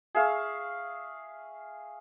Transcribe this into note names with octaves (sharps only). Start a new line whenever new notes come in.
G#4 E5 F5 C#6